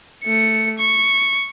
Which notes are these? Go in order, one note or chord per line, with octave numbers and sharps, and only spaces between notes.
A3 C#7
C#6